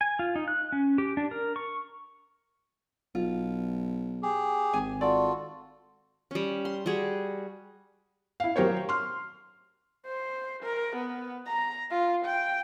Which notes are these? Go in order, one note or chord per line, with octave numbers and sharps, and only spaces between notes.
G#5
F4
D#4
F#6
C#4
G4
D4
A#4
C#6
B1 F4
G4 G#4
G#1 G#5
F4 F#4 A4 D5
G3 C#4
C6
G3 F#4 G#4
E4 F5
F#3 G4 A#4 C5 C#5
C6 F6
C5
A#4
B3
A#5
F4
G5